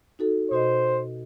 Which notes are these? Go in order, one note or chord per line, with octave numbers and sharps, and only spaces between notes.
D#4 F#4 A4
B2 F#4 C5 D#5